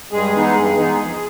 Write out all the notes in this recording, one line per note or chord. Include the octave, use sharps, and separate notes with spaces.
G2 G#3 G#4
E3 G#3 B3 D#4
G2
E3 G#3 B3 D#4
F2